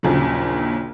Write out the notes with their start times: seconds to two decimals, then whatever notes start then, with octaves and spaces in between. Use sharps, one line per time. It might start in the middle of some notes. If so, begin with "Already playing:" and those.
0.03 A#1 D#2 A#2 C#3 F#3